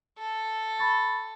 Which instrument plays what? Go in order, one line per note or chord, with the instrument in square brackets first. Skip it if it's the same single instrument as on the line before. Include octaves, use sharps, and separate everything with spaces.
[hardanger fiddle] A4
[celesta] B5 C#6 A6